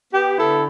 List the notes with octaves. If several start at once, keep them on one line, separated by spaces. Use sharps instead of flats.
B3 G4
D3 E4 A4